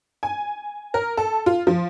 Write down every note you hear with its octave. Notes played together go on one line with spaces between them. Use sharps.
G#5
A#4
A4
F4
F3